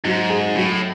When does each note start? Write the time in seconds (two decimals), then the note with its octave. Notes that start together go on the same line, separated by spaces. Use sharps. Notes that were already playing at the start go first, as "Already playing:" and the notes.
0.05 G#2 F#3
0.30 G#4
0.55 A2 F#3